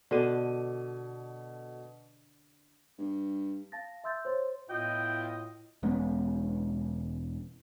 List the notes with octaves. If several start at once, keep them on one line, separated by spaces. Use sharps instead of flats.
B2 D3 D4 A4 D#7
G2
F5 A5 A6 A#6
E5 C6 E6 G6 A6
C5 C#5 C6
A2 B3 E4 F4 D#5 G5
E1 G#3 B3 C#4